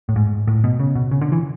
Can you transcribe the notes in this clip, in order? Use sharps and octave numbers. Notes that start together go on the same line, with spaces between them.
A2
G#2
A2
B2
C#3
B2
C#3
D3
E3